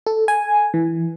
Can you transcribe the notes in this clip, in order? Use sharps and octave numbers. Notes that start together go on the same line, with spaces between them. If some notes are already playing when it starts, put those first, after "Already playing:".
A4
G#5
E3